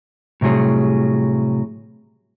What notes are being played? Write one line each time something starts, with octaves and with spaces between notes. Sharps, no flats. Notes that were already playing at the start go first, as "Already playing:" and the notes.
A2 C3 F#3 G3 G#4